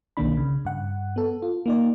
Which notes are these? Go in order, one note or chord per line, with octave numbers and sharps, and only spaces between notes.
B1 B2 D#3 A#3 D4 B5
C#3
G2 F#5
B3 A4
F4
A#3 D#4 D5